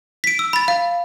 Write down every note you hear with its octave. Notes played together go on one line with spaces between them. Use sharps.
B6 D7
E6
B5 A6
F5